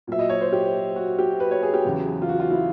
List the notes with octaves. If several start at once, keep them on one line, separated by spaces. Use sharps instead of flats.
A#2 F#3 E5
D#5
C#5
C5
G4
F#4
G4
B4
C#5
G#4
G4
E2 C#3 F#3
F4
F#4
F4
E4